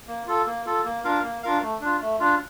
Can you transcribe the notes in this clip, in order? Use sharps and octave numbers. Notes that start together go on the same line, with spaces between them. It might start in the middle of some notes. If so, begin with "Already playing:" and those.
A#3
F4 A4
A#3
F4 A4
A#3
D4 F4 A#4 F5
A#3
D4 F4 A#4 F5
A3
D4 F4
A3
D4 F4